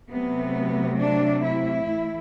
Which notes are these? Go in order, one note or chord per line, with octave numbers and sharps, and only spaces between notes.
C3 F#3 A3 B3
D4
E4
A2 E3 A3